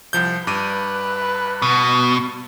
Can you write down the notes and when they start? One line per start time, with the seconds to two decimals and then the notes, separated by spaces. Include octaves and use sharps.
0.13 C2 F3 G6
0.47 G2 B4 D6 D#7
1.62 B2